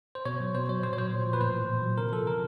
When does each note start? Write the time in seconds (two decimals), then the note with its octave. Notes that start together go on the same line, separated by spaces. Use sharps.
0.15 C5
0.25 B2 C#5
0.40 F#3
0.54 B2 C5
0.69 F#3 C#5
0.83 A#2 C5
0.93 C#5
0.98 F#3 C5
1.12 A#2
1.26 F3
1.33 B4
1.41 A2 C5
1.54 E3
1.69 A#2
1.83 F#3
1.98 C3 A#4
2.13 F3 A4
2.27 C#3 A#4